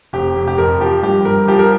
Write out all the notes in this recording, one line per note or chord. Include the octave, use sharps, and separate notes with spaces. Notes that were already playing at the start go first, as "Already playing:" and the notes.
F1 G4
F1
G4
F2 A#4
F3 G4
G2 G4
G2 A#4
F3 G4
A#4